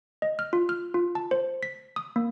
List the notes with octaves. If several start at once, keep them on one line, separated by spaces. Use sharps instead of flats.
D#5
F6
F4
F6
F4
A5
C5
B6
D#6
A#3